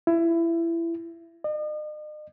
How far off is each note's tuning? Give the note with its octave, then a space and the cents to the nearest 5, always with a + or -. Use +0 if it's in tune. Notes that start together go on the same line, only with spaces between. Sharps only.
E4 +20
D#5 -45